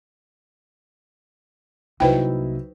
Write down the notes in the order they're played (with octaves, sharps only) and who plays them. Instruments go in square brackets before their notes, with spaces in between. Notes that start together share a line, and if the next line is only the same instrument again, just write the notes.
[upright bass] C2 A#3 [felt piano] F#3 D#4 E4 [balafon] B4 C5 G5